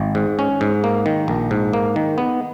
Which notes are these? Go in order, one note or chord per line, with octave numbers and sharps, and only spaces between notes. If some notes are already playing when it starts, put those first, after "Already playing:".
Already playing: G#1
G#2
C#4
G#2
A#3
D#3
A#1
G#2
A#3
D#3
B3